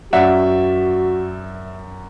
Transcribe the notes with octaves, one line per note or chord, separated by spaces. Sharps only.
F#2 F#4 D5 E5 F#5 B6